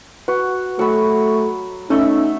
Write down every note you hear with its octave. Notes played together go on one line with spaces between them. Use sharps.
F#4 B4
F#3 A3 B5 C#6
A3 C#4 D#4 E5